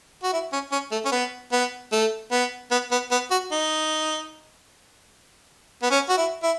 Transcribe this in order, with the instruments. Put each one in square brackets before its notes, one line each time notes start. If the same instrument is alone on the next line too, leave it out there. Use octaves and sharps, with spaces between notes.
[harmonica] F#4
E4
C#4
C#4
A3
C#4
B3
B3
A3
B3
B3
B3
B3
F#4
D#4
B3
C#4
F#4
E4
E4